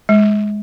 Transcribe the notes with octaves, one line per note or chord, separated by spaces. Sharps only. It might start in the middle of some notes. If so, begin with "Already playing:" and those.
G#3